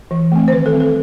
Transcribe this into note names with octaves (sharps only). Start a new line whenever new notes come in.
E3
A3 C4
C5
D#3 B4
A4
G3 C4
A4